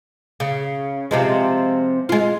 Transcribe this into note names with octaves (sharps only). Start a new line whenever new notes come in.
C#3
C3 F3 G#3
G#3 F4